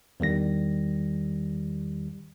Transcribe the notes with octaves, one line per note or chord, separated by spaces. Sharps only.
E2 D#3 G3 A#6